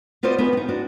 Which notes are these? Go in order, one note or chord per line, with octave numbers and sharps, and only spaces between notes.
B3 F4 F#4 C5 D5 D#5
B3 D#4 F#4 G#4 B4
C4 D#4
D4 F#4